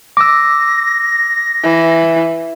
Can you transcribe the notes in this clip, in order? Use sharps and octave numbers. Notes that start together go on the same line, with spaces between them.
D6 E6 A#6
E3